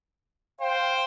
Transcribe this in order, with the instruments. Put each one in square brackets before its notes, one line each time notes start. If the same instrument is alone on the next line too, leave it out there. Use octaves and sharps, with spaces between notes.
[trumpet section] C5 G5 [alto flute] F5